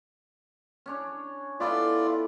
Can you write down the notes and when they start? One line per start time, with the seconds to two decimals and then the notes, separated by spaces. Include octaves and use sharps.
0.86 C#4 D4 C#5
1.60 B3 E4 F4 A4 D5